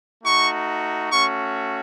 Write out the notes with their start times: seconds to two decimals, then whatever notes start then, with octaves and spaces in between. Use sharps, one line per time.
0.21 A3 D#4 F#4 C#6
1.11 A3 C#4 F#4 C#6